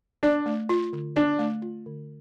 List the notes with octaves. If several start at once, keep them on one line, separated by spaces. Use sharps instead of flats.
D4 D5
A3
F4
D3
D4 D5
A3
F4
D3